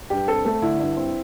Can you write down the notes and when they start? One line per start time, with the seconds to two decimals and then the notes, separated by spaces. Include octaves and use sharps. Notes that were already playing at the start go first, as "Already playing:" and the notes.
0.10 G2 G4
0.28 C4 A4
0.45 A3 A4
0.62 D3 E4
0.80 G2
0.97 C4